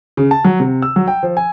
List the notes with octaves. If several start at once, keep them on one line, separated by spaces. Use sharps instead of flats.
C#3
A5
F#3
C3
E6
F#3
G5
F3
G#5